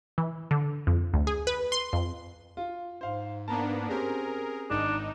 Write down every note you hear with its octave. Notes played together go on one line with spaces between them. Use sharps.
E3
D3
F2
D2
G#4
B4
C6
F2
F4
G#2 C5 F5
A#3 B3 D4 A5 A#5
C4 C#4 G4 G#4 A#4
G#1 D4 D#4